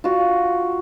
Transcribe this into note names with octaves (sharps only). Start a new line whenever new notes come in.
F4 F#4